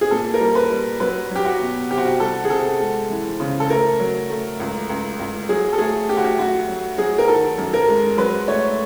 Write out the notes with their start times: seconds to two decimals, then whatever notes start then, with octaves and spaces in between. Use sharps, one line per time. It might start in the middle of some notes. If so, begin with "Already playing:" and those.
0.01 G#4
0.11 A#2 A4
0.34 A#4
0.40 G3
0.55 B4
0.71 G3
1.00 F#3 B4
1.31 F#3 G4
1.45 F#4
1.60 B2
1.91 C3 G4
1.98 F#4
2.05 G4
2.20 G3 A4
2.45 G#4
2.50 C3 A4
2.80 G#3
3.10 E3
3.40 C#3
3.60 A4
3.69 A3 A#4
4.00 F#3
4.30 A3
4.60 C#2
4.90 C#2
5.20 C#2
5.49 F#3 G#4
5.73 A4
5.78 A3 G#4
6.09 A3 G4
6.17 F#4
6.25 G4
6.38 D2 F#4
6.68 F#3
6.98 F#3 G#4
7.18 A#4
7.28 D#3 A4
7.58 F#2
7.73 A#4
7.89 G#3
8.17 F#3 B4
8.48 A3 C#5